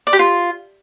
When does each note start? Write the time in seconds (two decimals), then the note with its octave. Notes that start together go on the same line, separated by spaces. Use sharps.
0.07 D5
0.13 G4
0.19 F4